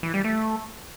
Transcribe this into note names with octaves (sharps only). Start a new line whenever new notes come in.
E3
G3
A3